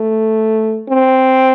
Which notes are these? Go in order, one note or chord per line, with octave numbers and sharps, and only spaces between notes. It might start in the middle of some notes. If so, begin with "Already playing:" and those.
Already playing: A3
C4